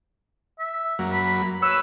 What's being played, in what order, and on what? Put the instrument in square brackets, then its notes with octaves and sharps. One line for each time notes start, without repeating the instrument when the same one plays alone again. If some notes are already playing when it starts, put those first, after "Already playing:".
[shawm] E5
[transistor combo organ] F#2 F#3 A#3
[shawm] B5
[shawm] B4 [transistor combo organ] C#5 B5 [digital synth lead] E6